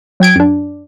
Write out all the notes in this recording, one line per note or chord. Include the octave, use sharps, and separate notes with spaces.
F#3 G5 G#6 D7
F#2 D4